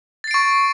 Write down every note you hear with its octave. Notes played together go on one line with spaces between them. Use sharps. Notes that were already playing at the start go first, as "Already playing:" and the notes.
C#6 A6 C7 D7